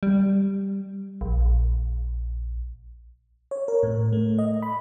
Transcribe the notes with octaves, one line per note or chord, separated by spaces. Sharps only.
G3
A#1
C#5
A#4
A2
A3
D#5
B5